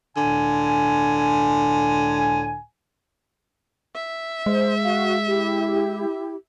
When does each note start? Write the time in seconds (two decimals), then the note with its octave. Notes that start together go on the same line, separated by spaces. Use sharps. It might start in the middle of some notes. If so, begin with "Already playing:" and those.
0.17 C#2 A2 D3 G#5
3.95 E5
4.46 G#3 C5
4.83 F#4 F5
5.26 E4 G4